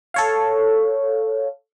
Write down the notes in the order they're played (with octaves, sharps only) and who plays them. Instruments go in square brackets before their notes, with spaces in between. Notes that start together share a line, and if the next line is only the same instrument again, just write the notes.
[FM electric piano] A4 C#5 F5